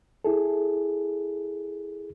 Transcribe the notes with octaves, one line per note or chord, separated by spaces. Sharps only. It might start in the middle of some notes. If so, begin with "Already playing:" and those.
E4 G#4 A4